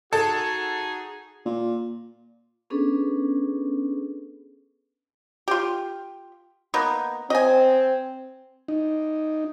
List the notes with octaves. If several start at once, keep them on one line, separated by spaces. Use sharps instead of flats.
D#4 F#4 G#4 A4
A#2
B3 C#4 D4 G#4 A4 B4
F4 G4
A#3 B3 D#4
C4 D#5 G#5
D#4